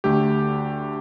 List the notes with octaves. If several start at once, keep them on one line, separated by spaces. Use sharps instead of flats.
D2 D3 A3 G4